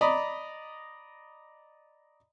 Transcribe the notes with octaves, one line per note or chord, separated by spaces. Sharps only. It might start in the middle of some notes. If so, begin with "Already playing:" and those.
D5 D#5 A#5 B5